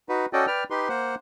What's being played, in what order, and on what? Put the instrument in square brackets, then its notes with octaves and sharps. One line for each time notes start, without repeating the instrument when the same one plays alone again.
[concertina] D#4 F#4 B4
C#4 F#4 A4 D5 D#5 G5
B4 D5 G5 F6
D#4 G4 B4 C6
A#3 C5 F#5